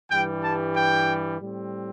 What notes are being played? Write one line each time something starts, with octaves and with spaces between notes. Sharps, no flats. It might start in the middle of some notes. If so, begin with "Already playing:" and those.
G2 E3 G3 G5
A5
G5
A2 G3 C4